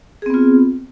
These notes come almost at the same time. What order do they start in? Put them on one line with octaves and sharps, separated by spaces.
G#4 C4 B3 F4